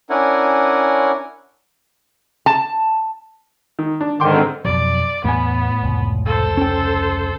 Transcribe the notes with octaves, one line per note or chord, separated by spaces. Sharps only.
C#4 D4 E4 A#4 F#5 G#5
A5
D#3
D4
G#2 D3 D#3 G5 C6 D6
C4 A4 A#4
F2 B2 F#3 D5
E2 A2 B3 G#5
F1 C#2
A4 C5
C#4 G5